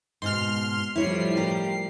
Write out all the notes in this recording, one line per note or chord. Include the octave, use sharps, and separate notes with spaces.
G#2 B2 C6 F6
A2 F3 G3 E4 C#5 C7
G4 A#4